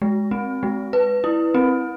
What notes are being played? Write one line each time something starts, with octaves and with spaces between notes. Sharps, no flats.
G#3
C4
G#3
B4
E4
C4